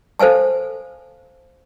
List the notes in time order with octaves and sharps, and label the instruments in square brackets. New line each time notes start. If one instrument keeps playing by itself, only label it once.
[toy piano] A4 C5 F5 G#5 A5